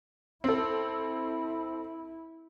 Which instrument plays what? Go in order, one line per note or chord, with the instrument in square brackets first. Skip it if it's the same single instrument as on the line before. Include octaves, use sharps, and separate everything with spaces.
[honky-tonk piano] C4 A4 [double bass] E4